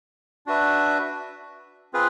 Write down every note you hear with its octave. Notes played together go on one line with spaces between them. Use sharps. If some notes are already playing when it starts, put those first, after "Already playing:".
D4 F#4 B4 E5
C4 F4 G#4 B4